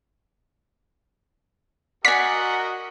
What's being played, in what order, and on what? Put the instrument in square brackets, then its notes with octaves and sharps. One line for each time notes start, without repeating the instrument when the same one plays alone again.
[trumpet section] F#4 A#4 D#5 [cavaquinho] D5 G#5 [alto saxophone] F#5 [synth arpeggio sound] B6